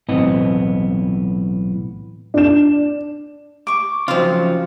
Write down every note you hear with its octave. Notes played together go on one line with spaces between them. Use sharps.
B1 A2 E3 B3 C4 D#5
D4 E7
C#6 D6
C#3 F3 F#3 C4 F4